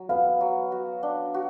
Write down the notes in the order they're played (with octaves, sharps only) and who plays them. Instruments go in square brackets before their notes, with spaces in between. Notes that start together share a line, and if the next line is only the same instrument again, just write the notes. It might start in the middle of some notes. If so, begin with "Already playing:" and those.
Already playing: [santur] F#3
[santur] B3 [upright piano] F5
[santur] F#3
F#4
D4
F#4